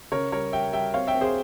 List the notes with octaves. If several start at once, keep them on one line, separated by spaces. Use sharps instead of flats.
C#3 A#4 C#5
G3 A#4 C#5
G3 E5 G5
G3 E5 G5
C4 C#5 F5
E5 G5
C4
G#4 C5